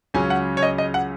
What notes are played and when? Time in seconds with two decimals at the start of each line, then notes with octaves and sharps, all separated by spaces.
0.14 C#2 C#3 F#3 C#4 G#5
0.30 F#5
0.57 C#5
0.63 D#5
0.78 D#5
0.94 F#5